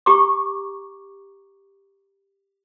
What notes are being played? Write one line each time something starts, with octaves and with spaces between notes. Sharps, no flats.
G4 A#5 C#6 D6